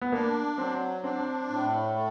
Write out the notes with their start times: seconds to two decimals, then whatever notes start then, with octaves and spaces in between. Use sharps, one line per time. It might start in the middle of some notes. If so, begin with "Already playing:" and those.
0.01 B3
0.12 A#3 D4
0.58 F#3 C4
1.04 C4 D4
1.49 A2
1.95 A3